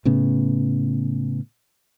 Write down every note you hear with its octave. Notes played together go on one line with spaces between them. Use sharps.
A2 C#3 B3